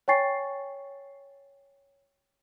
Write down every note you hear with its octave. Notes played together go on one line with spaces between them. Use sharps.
C#5 G5 G#5 C#6 A6 C7